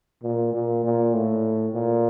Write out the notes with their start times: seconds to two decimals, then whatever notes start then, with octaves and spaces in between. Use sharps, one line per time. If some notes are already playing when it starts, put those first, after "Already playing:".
0.23 A#2
0.53 A#2
0.84 A#2
1.14 A2
1.74 A#2